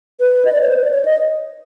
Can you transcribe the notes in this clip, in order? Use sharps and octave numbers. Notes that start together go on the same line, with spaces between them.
B4
D#5
D5
C#5
C5
B4
D5
C#5
D#5